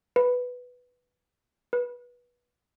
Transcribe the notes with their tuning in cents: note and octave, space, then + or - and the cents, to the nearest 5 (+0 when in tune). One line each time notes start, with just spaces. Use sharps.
B4 +0
B4 -20